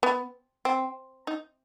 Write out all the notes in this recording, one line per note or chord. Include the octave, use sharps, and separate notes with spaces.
B3
C4
D#4